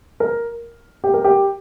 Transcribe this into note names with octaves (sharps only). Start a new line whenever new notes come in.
A#4
G4
A#4
G4